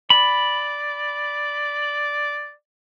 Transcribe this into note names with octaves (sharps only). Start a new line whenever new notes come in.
D5 B5